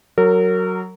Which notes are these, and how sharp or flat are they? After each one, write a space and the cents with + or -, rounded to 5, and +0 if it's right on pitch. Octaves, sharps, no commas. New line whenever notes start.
F#3 +5 A#4 -30